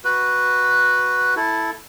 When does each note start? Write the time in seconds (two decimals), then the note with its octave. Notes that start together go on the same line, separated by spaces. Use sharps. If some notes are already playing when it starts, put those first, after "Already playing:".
0.04 F#4 B4
1.36 E4 A4